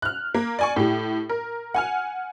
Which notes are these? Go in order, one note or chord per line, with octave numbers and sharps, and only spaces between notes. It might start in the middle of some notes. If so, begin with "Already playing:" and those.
F6 F#6
A#3
D5 G#5 C#6
A2 G4
A#4
F#5 G#5 F6